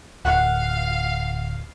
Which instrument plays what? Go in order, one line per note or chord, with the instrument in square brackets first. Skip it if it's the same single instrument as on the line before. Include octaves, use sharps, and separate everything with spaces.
[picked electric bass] D1 [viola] F5 [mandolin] F#5